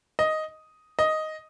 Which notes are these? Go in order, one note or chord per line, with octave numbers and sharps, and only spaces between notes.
D#5
D#5